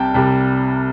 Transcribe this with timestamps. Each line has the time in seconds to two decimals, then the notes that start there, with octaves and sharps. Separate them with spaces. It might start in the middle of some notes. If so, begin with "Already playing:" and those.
Already playing: C2 C3 G3 G5 A5
0.14 C2 C3 G3